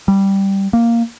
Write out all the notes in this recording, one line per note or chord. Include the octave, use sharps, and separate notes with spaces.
G3
A#3